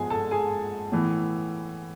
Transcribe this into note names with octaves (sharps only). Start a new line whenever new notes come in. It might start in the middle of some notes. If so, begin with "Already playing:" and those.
Already playing: G#2 F3 G#3 B3 G#4 G#5
A4 A5
G#4 G#5
A2 E3 B3